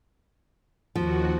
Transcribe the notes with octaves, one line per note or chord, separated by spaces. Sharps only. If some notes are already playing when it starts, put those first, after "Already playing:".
D#2 F3 F#4